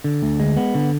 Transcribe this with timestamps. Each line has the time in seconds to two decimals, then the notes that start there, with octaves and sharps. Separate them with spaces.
0.04 D3
0.23 D2
0.40 G#3
0.57 B3
0.75 D3